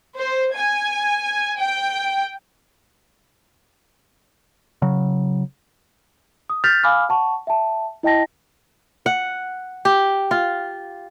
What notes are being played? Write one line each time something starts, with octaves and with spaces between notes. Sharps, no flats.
C5
G#5
G5
C#3 F#3
D#6
F6 G6 A6 B6 F7
F5 G#5 B5 D6 E6 F6
F#5 A5 C#6
E5 G5 A5
E4 D#5 G5 A5 A#6
F#5
G4
F4